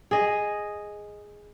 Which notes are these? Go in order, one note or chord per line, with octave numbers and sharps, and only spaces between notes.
G#4 D#5